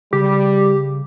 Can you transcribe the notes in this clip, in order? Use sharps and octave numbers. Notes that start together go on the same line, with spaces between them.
C#3 G3 G4